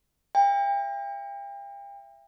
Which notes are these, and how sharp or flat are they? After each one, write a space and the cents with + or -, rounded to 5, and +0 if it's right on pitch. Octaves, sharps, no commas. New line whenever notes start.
E5 +30 G5 +35